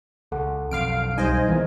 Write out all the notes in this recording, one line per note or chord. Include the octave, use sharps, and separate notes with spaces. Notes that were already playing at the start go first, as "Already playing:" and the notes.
C#2 A4 F#5
B1 F2 F5 F6 D7
C2 G3 D#4 C5 D#5 G#5
D#3 E3 G#3 B3